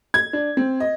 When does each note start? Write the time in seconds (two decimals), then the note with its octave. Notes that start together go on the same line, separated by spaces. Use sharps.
0.14 G#6
0.33 D4
0.57 C4
0.80 D#5